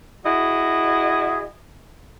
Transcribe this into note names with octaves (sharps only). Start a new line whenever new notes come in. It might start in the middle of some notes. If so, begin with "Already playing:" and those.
E4 F#4 G#4 D#5